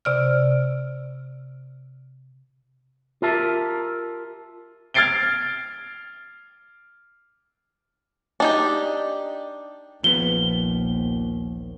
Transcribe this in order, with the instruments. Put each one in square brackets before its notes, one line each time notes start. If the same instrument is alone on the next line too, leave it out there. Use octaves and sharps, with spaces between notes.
[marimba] C3 D5 F6
[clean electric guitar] F4 G4 A#4 E5 A5
[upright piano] F6 G#6 A6 C7 D7 G7
[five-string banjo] D4 D#4 G4
[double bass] A#1 D#2 [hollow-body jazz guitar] F3 B3 [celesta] G7